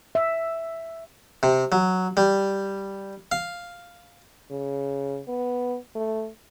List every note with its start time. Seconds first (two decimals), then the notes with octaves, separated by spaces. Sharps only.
0.15 E5
1.43 C3
1.72 F#3
2.17 G3
3.32 F5
4.51 C#3
5.28 B3
5.95 A3